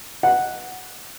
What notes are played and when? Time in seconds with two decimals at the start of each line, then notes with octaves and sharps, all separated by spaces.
0.23 F#5